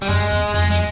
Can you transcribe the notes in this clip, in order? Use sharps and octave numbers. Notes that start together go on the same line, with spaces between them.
G3
F#2 G#3
E2
F2 G#3
G#3